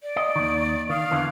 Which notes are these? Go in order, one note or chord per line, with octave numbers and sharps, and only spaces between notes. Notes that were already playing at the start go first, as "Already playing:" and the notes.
D5
D#5
D#2 D#3
D#3 F5
E2 D3 E3